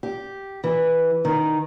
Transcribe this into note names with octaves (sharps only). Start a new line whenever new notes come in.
G4
E3
D#3